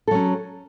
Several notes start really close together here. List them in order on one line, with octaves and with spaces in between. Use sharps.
A4 F#3 C#4